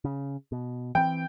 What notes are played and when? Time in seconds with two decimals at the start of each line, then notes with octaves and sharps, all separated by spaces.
0.04 C#3
0.52 B2
0.95 E3 C4 G5